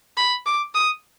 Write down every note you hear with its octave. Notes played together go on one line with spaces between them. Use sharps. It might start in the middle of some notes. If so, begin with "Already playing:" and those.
B5
D6
D#6